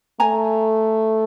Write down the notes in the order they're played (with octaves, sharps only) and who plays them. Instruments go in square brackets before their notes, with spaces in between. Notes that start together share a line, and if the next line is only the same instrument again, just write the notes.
[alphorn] A3 [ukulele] G#5 A#5